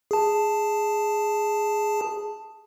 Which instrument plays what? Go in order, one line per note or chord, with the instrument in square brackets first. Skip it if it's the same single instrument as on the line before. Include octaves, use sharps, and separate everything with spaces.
[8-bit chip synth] G#4 A5